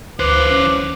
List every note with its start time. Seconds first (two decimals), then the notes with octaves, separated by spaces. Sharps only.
0.20 D2 E3 B4 C5 D6 F#6
0.51 C#4